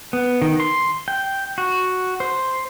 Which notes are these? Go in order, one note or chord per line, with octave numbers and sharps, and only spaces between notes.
B3
D#3
C6
G5
F#4
C5